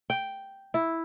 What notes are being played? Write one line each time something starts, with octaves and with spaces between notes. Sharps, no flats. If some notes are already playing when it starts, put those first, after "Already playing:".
G5
E4